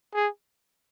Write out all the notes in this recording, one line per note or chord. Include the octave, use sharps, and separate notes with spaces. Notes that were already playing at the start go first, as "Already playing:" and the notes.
G#4